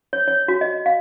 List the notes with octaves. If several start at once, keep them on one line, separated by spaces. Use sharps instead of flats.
C#5
C#5
F#4
D#5
F5